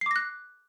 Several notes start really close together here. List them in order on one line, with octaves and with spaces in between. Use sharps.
C7 D6 A#6 F#6